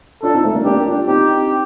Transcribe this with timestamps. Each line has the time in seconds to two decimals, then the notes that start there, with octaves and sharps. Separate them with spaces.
0.22 D4 F4 A4
0.34 C4 D#4
0.44 A3 C4
0.55 A#3 D4
0.65 A#3 D4 G4
0.86 D4 F4
1.07 C4 D#4 G4